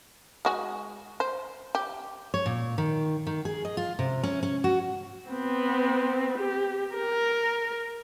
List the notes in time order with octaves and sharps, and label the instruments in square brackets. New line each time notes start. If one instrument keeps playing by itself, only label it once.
[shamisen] G#3 F#4 G#4
C5
G4
[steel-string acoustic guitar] C#5
A#2
D#3
D#3
G#4
D#5
F4
C3
C#4
C#4
F#4
[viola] B3 C4
G4
A#4